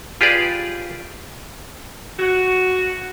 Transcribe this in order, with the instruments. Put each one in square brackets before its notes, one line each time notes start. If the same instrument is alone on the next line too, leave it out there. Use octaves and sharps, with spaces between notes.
[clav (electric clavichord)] F4 G4 G#4 B4 D5
[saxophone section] F#4